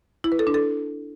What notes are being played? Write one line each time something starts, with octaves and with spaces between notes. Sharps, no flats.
E4
B4
A4
D4
A4